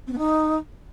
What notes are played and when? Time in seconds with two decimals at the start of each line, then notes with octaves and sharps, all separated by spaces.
0.07 C4
0.12 B3
0.17 D#4